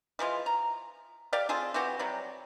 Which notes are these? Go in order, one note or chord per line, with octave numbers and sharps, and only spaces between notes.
E3 F3 G#3 F4
A#5
G4 D5 F5
C4 F4 G#4 A4
E3 C4 F#4 G4
C3 F#3 G3